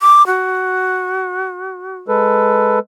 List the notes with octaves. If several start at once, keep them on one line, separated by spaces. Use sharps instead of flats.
D6
F#4
G#3 A4 B4